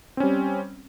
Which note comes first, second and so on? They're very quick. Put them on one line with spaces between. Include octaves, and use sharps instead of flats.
C4 C#4 G3